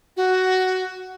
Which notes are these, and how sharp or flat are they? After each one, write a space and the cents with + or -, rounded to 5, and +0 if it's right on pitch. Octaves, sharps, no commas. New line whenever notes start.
F#4 +10